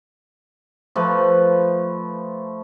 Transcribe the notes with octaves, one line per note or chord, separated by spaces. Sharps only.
F3 A3 B4